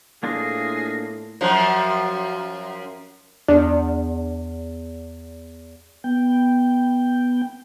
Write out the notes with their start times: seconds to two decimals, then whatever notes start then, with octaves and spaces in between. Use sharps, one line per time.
0.23 A2 A#3 D4 F4 G#4 A#6
1.41 F#2 F3
3.48 E2 D4
6.04 B3 G5